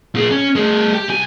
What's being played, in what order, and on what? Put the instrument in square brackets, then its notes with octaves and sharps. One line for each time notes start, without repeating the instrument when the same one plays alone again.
[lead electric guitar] A#2 G#4
C#4
A3 G#4
G4
C2 G#5